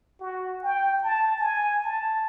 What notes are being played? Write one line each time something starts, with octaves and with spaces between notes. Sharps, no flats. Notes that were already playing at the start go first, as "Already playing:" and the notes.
F#4
G5
A5
G#5
A5